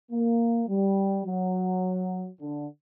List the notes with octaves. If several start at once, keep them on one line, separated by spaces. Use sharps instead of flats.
A#3
G3
F#3
D3